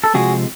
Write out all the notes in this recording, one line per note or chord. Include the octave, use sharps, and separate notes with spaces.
A4
C3 F3 G#3 C4 F#4 G#4